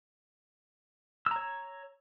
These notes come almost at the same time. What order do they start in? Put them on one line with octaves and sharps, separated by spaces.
E6 A#5 C#5